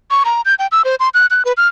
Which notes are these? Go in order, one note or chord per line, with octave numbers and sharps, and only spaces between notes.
C#6
A#5
G6
G5
E6
C5
C6
F#6
F#6
B4
F6